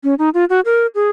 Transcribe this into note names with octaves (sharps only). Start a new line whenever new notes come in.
C#4
D#4
F4
F#4
A#4
G#4